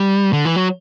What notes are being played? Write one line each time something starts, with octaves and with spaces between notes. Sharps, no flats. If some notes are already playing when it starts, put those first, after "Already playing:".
Already playing: G3
D3
E3
F#3